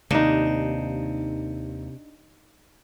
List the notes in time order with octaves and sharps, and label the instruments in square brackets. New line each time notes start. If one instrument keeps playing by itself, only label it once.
[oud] D#2 [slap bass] C3 [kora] D4 D#4